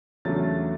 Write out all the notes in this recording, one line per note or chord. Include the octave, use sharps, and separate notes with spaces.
E2 C#3 F#3 A3 D4 A6